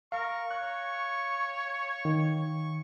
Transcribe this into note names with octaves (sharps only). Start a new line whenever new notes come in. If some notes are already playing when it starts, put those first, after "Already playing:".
A#4 F5 C#6
C#5 F#6
D#3